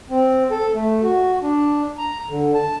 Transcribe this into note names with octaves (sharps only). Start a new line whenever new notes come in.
C4
A4
A3
F#4
D4
A#5
D3
A5